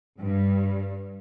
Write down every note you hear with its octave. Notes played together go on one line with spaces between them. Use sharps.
G2